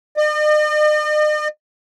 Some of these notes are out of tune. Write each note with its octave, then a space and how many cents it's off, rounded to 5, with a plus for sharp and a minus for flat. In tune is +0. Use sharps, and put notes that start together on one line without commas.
D#5 -45